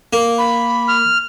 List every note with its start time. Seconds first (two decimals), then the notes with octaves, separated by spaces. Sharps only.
0.13 A#3
0.38 B5
0.88 F6